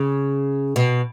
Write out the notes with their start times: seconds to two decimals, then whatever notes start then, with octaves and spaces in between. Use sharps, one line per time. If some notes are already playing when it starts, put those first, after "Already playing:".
Already playing: C#3
0.76 B2